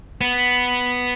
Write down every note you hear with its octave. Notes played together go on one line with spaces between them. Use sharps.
B3